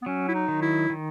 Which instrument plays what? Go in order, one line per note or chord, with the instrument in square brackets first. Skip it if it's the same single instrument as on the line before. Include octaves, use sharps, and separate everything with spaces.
[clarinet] B3
[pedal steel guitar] F#3 [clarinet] C#4
[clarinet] E4
D#4
[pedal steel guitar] D#3
[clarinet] E4
[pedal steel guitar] D#3